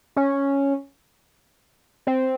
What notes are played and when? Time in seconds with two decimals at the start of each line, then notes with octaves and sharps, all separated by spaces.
0.16 C#4
2.07 C4